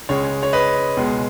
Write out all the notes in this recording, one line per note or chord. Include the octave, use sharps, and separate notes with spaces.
C#2 C#3 G#3 C#5
C#5
B4 D#5
C#2 B2 G#3